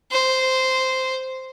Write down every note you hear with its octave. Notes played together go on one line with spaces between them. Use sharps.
C5